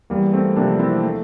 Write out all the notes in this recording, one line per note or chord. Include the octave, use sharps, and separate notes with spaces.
E2 G3 A#3
A3 C4
C3 F3 A#3 D4
C4 E4
A3